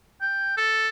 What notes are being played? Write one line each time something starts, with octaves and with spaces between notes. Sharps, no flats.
G5
A4